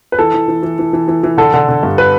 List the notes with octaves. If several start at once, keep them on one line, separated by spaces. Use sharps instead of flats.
B4
E3 A4
E3
E3
E3
E3
E3
E3
E3
D3 A4
D3 A4
D3
G2
B4